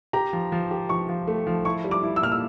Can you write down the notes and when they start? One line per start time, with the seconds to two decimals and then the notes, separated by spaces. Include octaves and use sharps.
0.13 G4 A#5
0.33 F3
0.52 F3
0.71 G4
0.89 F3 C#6
1.09 F3
1.28 A3
1.47 F3
1.65 E4 C#6
1.84 G3
1.91 D6
2.03 E4
2.16 E6
2.22 A#2 F6
2.32 E6